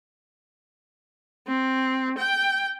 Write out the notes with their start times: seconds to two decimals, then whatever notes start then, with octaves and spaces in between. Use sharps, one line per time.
1.47 C4
2.18 G5